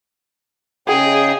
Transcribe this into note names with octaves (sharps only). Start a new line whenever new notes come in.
C#3 G#4 D#5 G5